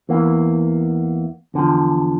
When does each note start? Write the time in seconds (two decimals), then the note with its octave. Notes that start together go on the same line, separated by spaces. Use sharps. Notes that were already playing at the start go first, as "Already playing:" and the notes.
0.09 E2 E3 A#3
1.54 E2 D3 F3